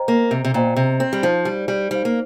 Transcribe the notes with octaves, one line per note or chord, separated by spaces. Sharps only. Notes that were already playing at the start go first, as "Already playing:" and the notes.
Already playing: C5 D#5 G5 A#5
A#3
C3
C3
A#2 C5 D#5 G5 A#5
C3
C4
G3
F3 D#4 C5 F5
G3
G3
G3 D#4 C5 F5
A#3